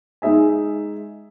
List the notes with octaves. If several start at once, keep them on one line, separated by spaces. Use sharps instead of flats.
G#3 D#4 G#4 E5 G#5